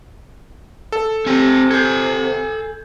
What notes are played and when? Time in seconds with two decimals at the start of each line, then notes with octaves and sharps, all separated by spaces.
0.92 A4
1.26 C3 C4 G#5
1.71 A4 G#5 G6 G#6